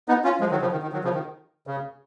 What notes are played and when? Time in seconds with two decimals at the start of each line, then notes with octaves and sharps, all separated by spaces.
0.08 B3 D#4
0.24 C#4 F4
0.40 F3 G#3
0.51 D#3 F#3
0.61 C#3 F3
0.72 D#3
0.82 D#3
0.92 D#3 F#3
1.04 C#3 F3
1.14 D#3
1.67 C#3